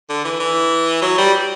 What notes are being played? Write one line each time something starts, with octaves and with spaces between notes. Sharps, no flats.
D3
E3
E3
F#3
G3